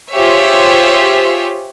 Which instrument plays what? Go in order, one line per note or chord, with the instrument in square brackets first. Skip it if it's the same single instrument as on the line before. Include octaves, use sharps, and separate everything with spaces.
[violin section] F4 G4 G#4 C5 C#5 E5